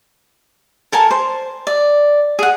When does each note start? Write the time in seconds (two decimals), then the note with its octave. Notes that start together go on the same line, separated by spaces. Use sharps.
0.92 A4 A#4 G#5 A5
1.11 C5
1.67 D5
2.39 G#4 F#5